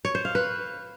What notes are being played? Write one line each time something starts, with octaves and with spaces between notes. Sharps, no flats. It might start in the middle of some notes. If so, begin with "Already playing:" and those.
C#5
C5
F5
B4